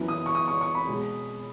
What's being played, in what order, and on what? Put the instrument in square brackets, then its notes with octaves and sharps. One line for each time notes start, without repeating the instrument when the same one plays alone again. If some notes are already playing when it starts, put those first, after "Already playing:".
Already playing: [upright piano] F#2 E3 B3
D#6
C#6
D#6
C#6
C#6
B5
B2 G#3